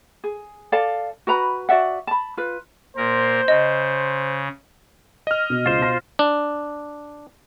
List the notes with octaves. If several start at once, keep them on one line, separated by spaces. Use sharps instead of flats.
G#4
A4 D5 F5 A5
F#4 B4 A#5 B5
F#4 D5 E5 F#5
A5 B5
F4 B4
A#2 A#4 C5
C#3 D#5
D#5 F6
B2
C#2 F4 C5
B2 A#6
D4